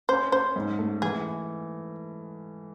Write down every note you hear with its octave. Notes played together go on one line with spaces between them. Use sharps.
C#4 C5
C#4 C5
G#2
A3
E3 G#4